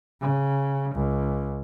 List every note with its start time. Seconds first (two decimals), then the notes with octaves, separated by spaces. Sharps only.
0.21 C#3
0.94 C#2